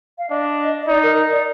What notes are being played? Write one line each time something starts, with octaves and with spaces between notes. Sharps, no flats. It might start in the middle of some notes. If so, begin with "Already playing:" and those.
F5
D4 D#5
D#5
D#4 D5
A#4
D5